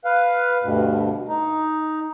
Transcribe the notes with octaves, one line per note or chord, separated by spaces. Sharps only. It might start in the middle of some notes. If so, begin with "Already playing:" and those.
B4 F5
D2 G2 B2
D#4